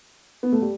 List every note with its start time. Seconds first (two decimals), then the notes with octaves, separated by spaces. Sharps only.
0.43 B3
0.52 A3
0.62 G3